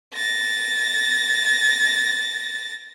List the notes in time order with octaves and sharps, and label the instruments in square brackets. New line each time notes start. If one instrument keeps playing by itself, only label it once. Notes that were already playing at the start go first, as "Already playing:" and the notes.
[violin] A6 A#6